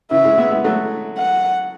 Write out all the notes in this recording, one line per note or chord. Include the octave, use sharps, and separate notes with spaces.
C#3 E3 E5
E3 G#3
G#3 B3
G#3 B3
F#3 A3
F#5